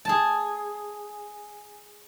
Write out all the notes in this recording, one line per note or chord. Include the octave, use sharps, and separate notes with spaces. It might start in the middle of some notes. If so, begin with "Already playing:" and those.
G#4 A5